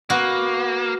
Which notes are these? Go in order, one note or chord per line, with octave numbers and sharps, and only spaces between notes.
A#3 B3 F#4